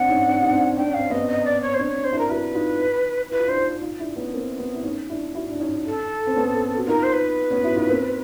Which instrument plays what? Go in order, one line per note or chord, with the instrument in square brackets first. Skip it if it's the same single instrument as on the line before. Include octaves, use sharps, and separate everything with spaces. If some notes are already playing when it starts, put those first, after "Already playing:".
Already playing: [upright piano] C4 D4 [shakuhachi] F#5
[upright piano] C#4 D#4
C4 D4
D#4
C4 D4
[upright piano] D4 [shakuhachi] G5
[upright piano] C#4
[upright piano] C4 [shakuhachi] F5
[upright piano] B3 C#4 [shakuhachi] D#5
[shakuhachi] D#5
D5
C#5
C5
[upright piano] C4 D4 [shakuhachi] C#5
[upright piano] C4 D4
[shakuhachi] C5
[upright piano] D4 E4
[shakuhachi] A#4
[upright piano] E4 F#4 [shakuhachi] B4
[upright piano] D#4 F4
[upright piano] E4 [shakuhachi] B4
[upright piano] F4
[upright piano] D4 E4 [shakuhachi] C5
[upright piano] D#4 F4
D#4 F4
D4 E4
B3 C#4
A#3 C4
B3 C#4
E4
C#4 D#4
D4 E4
E4 F#4
D4
C#4 D#4
[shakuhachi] A4
[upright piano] C4
B3 C#4
F#4
[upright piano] D#4 F4 [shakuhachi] A#4
[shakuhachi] C5
B4
[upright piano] B3 C#4
E4 F#4
D#4 F4
A#3 C4